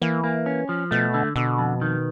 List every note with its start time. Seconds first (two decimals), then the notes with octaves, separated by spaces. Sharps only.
0.02 E3 A#3
0.24 A#3
0.46 C#4
0.69 F3
0.91 B2 A3
1.14 D3
1.36 B2 D3
1.58 F2
1.81 D#3